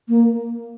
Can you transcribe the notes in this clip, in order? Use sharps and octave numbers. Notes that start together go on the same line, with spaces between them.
A#3